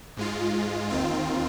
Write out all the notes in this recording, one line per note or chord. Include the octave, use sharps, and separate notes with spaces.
G#2 G#3 F4
D#2 D#3 C4 F4